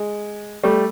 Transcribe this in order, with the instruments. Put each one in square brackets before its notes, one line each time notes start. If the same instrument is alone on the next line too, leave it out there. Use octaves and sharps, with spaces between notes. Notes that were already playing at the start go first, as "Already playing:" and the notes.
Already playing: [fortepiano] G#3
G3 A3